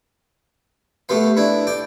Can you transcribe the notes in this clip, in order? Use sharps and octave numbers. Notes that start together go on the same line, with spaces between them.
A3 B3 G4 B4 F5
D4 E4 B4
D5 G5 D6